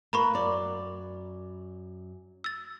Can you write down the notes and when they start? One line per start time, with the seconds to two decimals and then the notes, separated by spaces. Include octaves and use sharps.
0.13 A#3 B4 A#5 B5 C#6
0.34 F#2 D5
2.44 E6 A6